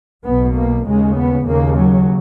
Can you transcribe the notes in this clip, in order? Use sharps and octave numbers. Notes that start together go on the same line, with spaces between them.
B1 B2 B3
A#3
D#2 C#3 G#3
B3
D#2 C#3 A#3
F#3